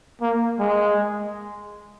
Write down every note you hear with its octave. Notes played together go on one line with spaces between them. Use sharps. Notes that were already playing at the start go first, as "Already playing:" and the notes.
A#3
G#3